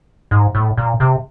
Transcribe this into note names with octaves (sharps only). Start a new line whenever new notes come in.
G#2
A2
A#2
C3